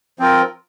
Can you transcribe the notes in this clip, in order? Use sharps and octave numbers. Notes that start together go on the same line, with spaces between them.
F3 C4 F4 A#4